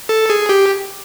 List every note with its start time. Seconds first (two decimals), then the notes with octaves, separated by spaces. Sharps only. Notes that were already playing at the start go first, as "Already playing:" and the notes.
0.09 A4
0.30 G#4
0.49 G4